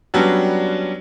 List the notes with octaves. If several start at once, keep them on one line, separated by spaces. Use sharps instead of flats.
F#3 G3 B3 C#4 D4 F#4